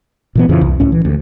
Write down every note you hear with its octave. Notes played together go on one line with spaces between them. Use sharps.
A#2 E3 B3
F2 C#3 E3 F3
C2
C#2 A2 C#4
E3
D2